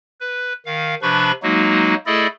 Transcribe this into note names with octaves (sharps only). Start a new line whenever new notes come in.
B4
D#3 F5
C3 F3 D4 B4 B5 C#6
F#3 G#3 A#3 D#4 F#4
A3 E4 G#4 A4 D5 D#5